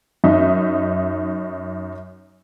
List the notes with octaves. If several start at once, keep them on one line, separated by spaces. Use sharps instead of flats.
F#2 D#4 E5